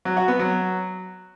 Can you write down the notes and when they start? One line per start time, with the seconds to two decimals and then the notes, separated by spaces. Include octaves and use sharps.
0.05 F#3
0.17 F#4
0.28 B3
0.39 F#3